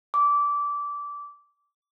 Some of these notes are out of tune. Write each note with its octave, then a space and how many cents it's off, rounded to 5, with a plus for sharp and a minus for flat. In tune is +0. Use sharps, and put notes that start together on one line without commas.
D6 -20